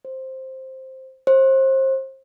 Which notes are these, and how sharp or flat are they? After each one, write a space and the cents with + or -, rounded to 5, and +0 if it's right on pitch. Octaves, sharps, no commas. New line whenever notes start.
C5 +5
C5 +30